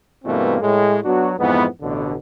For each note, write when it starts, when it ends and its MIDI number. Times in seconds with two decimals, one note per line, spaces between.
0.24 0.56 43
0.24 0.56 47
0.24 0.56 52
0.24 0.56 57
0.24 0.56 58
0.24 0.56 60
0.61 0.98 45
0.61 0.98 56
1.04 1.32 54
1.04 1.32 59
1.04 1.32 62
1.04 1.32 66
1.37 1.65 41
1.37 1.65 44
1.37 1.65 52
1.37 1.65 59
1.81 2.14 33
1.81 2.14 47
1.81 2.14 50